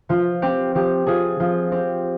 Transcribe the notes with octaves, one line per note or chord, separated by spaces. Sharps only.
F3 F4
C4 G4
F3 G4
C4 F4 G#4
F3 F4
C4 G4